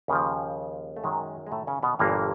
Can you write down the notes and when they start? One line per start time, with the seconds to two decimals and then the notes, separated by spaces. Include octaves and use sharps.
0.08 D#2 C#3 F3
0.97 A3
1.04 F#2 D#3 F#3 G#3
1.47 G#3
1.52 A2 A3
1.67 C#3 C#4
1.83 B2 B3
1.99 G1 G2 A#2 E3 A#3